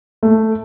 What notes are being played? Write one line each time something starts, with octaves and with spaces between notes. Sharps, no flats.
A3